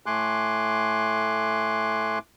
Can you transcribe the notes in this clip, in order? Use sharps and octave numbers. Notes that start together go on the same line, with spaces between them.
A2 A3 G#5 C6 D6 F#6